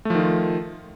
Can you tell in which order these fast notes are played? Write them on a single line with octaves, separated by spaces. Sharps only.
A3 F3 D#3 F4